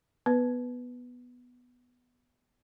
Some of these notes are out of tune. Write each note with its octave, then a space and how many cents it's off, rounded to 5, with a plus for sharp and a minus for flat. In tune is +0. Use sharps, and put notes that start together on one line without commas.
B3 +0 B4 +0